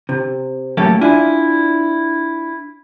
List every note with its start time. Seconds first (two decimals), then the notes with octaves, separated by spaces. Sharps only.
0.09 C3
0.77 A2 F#3 A#3 C#4 G4 A4
1.01 D4 E4 F4 G#5